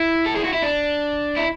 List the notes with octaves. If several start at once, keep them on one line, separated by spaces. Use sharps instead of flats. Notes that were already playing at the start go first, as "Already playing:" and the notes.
Already playing: E4
A4
G#4
F#4
E4
D4
E4